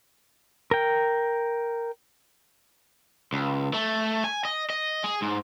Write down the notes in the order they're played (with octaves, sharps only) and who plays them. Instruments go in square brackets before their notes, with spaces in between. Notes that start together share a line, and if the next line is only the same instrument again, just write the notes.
[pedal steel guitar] A#4 G5
[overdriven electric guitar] C#2
A3
G#5
D#5
D#5
G#4
G#2